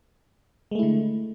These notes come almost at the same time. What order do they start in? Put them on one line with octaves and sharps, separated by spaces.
G#3 A3 E4 D3